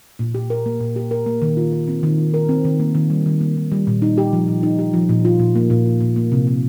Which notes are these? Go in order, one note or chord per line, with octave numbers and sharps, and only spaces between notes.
A#2
G4
A#4
A#3
A#2
G4
A#4
A#3
D#3
F4
A#4
C4
D#3
F4
A#4
C4
D#3
A#3
D#3
G3
D#3
A#3
D#3
G3
A#2
D#4
G4
F3
A#2
D#4
G4
F3
A#2
F4
A#2
A#3
A#2
F4
A#2
A#3
C3
A#3